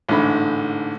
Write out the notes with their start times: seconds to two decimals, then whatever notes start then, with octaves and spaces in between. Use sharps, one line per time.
0.09 A1 G#2 D3 B5